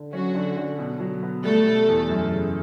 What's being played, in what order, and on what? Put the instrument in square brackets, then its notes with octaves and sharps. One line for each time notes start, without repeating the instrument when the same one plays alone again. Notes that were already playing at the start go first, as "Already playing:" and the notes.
Already playing: [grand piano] D3
[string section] F#3 F#4 [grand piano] C#4
[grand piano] D3
D3
B2
F#3
B3
[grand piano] G3 [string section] A3 A4
[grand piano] B2
E2
F#2
C#3